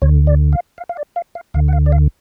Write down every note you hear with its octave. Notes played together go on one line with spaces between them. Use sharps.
D2 D3 C#5
D5
F5
F5
F5
D5
F5
F5
D2 D3 F5
F#5
F5
D5
F5